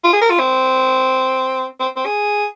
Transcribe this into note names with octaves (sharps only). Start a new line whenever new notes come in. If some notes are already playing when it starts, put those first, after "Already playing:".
F4
G#4
A#4
F4
C4
C4
C4
G#4